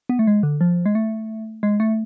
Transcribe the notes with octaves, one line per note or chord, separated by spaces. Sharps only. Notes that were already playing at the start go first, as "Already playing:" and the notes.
B3
A3
G#3
D3
F3
G#3
A3
G#3
A3